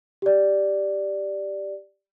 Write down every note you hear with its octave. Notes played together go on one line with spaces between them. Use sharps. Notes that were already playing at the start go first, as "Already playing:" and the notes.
G4 D5